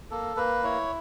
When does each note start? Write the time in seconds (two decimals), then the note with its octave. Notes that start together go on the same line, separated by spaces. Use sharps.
0.11 A#3 A4
0.37 A#3 B4
0.63 E4 C#5